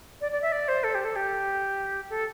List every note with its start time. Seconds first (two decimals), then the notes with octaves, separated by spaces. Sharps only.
0.21 D5
0.32 D5
0.42 E5
0.52 D5
0.68 C5
0.84 A4
0.95 G4
1.05 A4
1.16 G4
2.10 A4